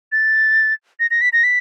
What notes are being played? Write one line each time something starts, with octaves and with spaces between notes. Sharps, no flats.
A6
A#6
A#6
B6
A#6
B6